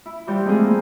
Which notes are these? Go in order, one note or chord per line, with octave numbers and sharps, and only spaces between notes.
E4
E3 F3 G3 G4
G#3 A3 C4 F4 G#4
A#3